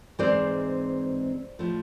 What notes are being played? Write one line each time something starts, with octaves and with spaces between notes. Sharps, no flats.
G#2 E3 G#3 C4 C5 D5
A2 F3 A3